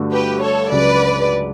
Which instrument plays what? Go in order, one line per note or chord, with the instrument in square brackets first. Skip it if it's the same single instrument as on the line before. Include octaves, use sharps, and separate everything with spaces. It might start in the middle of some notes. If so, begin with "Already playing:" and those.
Already playing: [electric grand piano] G2 D3 A3 D4 F#4
[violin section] G4 B4
A4 C#5
[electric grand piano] C#2 C#3 F#3 C#4 [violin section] B4 D5